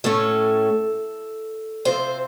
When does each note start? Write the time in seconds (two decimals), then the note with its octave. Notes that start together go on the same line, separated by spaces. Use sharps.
0.04 A2 A3 C#4 A4
1.85 C3 F3 C4 C5